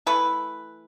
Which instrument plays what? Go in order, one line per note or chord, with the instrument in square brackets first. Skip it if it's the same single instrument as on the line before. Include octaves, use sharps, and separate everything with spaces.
[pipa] E3 A3 B4